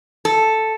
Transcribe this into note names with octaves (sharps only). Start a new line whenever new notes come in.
A4